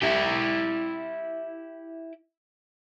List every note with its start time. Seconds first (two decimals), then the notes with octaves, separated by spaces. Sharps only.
0.02 E4 G4